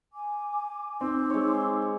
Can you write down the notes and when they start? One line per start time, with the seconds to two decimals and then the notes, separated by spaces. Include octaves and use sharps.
0.13 G#5 D6
1.01 C4 D#4 C6 D6 E6
1.30 G#3 C#5